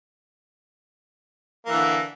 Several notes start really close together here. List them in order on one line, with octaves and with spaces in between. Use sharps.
A#3 E3 D3